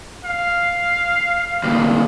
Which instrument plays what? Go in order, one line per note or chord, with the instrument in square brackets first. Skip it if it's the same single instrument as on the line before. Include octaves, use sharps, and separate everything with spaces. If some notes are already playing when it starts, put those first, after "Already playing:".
[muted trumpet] F5
[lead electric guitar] D2 A#2